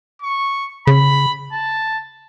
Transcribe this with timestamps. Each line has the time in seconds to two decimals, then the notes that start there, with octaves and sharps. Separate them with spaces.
0.22 C#6
0.87 C#3 B5
1.52 A5